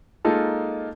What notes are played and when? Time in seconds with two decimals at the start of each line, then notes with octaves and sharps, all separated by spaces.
0.25 G#3 A#3 D#4 F4 A4